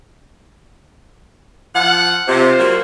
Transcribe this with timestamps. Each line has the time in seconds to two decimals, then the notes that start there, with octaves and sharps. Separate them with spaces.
1.75 F3 F5 F#5
2.28 C3 F4 C5
2.60 F#3 G3 A#3